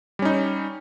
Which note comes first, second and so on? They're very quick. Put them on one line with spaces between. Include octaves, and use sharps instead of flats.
G3 C#4 D#4